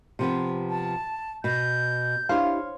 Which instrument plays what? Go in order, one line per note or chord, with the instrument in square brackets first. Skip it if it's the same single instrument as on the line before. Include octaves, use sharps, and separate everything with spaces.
[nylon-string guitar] C3 F3 B3
[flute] A5
[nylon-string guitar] B2 [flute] G6
[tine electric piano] D4 E4 G4 [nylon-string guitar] C5 C#5 [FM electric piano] F5